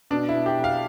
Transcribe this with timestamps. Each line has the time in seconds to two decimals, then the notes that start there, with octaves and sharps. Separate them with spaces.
0.11 B2 D4
0.29 E4
0.34 B2
0.46 G4
0.58 B1
0.64 F5